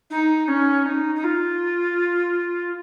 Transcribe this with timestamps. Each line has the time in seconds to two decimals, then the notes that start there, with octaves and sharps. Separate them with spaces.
0.10 D#4
0.48 C#4
0.85 D#4
1.15 D#4
1.24 F4